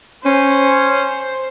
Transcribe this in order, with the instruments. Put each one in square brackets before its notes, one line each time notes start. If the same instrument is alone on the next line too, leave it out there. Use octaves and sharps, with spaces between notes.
[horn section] C#4 [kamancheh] C5